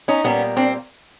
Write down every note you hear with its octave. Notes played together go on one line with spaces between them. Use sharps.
C#4 D#4
A#2 G3 A#3 B3 C#4
C4 D4